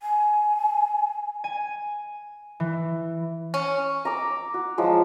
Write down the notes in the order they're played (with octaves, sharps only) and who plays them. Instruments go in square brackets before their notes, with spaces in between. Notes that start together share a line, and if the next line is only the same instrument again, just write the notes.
[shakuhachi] G#5
[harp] G#5
E3
[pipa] C#4
[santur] A#5 D6 E6
F#4
F3 F#3 G#3